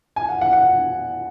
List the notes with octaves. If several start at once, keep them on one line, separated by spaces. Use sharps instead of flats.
G#5
F#5
F#5
F#5